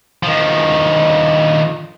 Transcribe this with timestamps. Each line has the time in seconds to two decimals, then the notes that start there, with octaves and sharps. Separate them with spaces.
0.23 D#3 F3